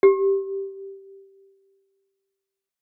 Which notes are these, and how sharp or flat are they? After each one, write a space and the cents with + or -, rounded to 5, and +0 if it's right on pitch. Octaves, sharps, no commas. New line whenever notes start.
G4 -10